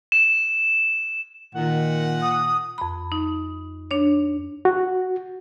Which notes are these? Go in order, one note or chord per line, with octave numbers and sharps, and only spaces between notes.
E7
A#2 D#3 F#5
D#6
F2 B5
D#4
D4 C#5
F#4